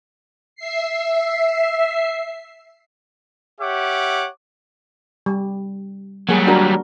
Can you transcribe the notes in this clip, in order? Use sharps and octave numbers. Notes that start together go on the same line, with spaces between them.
E5 C7
G4 C#5 E5 F#5 D6
G3
F#3 G3 A#3 G#4
D4 F#4 A#4